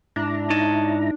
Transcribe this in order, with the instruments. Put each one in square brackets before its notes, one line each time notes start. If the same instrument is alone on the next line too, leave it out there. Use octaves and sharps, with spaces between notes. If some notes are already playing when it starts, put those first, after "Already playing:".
[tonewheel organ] G#2 E4 A#5 [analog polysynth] D4
[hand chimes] D#4 [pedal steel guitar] C#5 D#5 A5